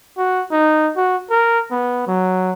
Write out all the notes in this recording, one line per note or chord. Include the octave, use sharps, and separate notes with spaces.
F#4
D#4
F#4
A#4
B3
F#3